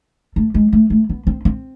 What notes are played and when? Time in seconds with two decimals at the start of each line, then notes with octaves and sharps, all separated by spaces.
0.36 A3
0.54 G#3
0.73 A3
0.90 A3
1.10 B3
1.27 C4
1.45 C4